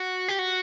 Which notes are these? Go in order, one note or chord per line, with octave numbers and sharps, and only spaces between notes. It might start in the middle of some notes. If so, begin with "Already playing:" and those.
Already playing: F#4
G4
F#4